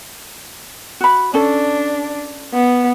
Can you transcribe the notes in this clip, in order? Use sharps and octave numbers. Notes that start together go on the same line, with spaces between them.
F#4 B5
C#4 D4 A4
B3